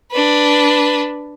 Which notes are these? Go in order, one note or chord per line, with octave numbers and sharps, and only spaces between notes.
D4 B4